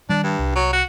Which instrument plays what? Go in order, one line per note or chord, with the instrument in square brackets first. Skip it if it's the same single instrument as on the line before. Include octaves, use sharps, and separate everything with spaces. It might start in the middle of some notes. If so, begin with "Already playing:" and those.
[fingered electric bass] D#3 G3 [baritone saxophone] D4
[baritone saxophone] G2
[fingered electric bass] C2
[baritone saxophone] F#3
F#4